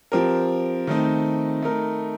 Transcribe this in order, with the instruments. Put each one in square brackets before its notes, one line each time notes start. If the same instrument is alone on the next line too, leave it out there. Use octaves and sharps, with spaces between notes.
[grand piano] F3 C4 G4 A#4
D#3 A3 C4 D#4
A3 D#4 A#4